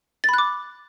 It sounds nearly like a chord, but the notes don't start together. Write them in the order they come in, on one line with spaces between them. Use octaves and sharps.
A6 B5 F#6 D6